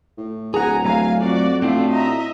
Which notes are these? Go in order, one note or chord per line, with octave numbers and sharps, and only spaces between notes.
A2
D1 G#4 F#5 G#5 A#5
F#3 A3 F5 G#5 A#5
F2 F#4 D5
A2 A3 C4 D4 F4 F#4
D#5 E5 A#5